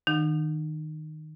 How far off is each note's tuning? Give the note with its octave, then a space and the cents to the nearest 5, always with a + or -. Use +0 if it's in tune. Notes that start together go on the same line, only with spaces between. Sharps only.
D#3 +0 D#4 -40 F#5 -30